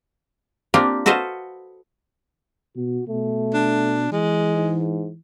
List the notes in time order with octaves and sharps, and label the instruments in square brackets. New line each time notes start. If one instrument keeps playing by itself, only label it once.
[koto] A#3 C4 D4 F4 G4
F#4 A4 B4 C5 D#5 F5
[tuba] B2 [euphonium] F#4
[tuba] B2 [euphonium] A3
[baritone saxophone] D4
[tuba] E3 [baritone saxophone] G#3
[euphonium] G#2